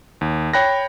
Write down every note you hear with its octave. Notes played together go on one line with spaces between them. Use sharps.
D#2
C#5 G5 B5 F#6 A#6